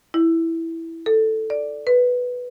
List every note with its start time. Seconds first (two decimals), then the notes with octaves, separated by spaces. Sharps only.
0.14 E4
1.06 A4
1.50 D5
1.87 B4